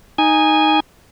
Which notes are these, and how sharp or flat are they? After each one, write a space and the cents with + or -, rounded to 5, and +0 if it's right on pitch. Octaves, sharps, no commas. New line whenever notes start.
D#4 +0 G#5 -10